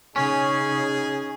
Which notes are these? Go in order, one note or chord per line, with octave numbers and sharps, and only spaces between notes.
C#3 C#4 D#4 G#4